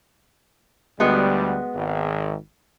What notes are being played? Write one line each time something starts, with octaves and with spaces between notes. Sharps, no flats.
D2 G3 G#3 B3 F#4
G#1